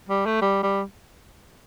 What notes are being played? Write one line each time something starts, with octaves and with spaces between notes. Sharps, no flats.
G3
A3
G3
G3